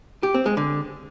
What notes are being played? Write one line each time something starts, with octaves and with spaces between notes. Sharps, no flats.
G4
C4
G#3
D3